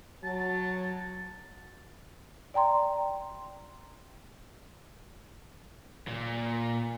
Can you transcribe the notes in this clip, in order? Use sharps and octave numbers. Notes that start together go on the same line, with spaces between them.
F#3 A5
D5 G5 A#5 C6
A#2